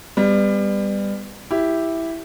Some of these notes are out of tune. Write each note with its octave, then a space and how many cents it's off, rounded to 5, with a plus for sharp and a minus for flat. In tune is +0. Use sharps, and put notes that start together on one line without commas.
G3 +25 B3 +20
E4 +0 G4 +0